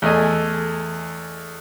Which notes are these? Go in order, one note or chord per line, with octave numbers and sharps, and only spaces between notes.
E2 A3 D#5 G#5